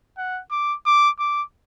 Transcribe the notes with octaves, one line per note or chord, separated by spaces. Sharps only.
F#5
D6
D6
D6